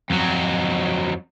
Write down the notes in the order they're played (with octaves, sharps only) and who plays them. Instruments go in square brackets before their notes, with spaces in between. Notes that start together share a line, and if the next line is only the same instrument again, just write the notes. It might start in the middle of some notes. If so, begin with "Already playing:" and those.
[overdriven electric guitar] F2 F#3